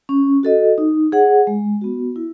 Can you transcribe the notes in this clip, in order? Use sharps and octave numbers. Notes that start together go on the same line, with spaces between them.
C#4
F#4 A4 D#5
D#4
G#4 C#5 F#5
G#3
B3 F#4
E4